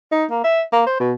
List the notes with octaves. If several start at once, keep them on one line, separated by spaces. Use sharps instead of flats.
D#4
A#3
E5
A#3
C5
B2